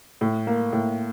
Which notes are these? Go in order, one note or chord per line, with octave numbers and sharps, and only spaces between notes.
A2
A#3
A2